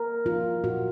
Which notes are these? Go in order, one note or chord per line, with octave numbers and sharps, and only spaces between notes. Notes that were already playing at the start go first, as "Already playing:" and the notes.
Already playing: A#4
F3 A#3 D#4 F4
A#2 F#4